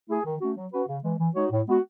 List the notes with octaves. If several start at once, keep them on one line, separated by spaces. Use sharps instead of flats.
A3 E4 G#4
D#3
A3 C#4 F#4
F#3
C#4 F#4 B4
C#3
E3 G#3
E3
G#3 D#4 F#4 C#5
A2
G#3 B3 F#4